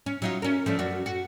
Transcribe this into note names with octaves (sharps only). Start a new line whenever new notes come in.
C#4
F#3 D#4 F4
C#4 A#4
F3 A3 D4
F#2 D4 F#4
F#4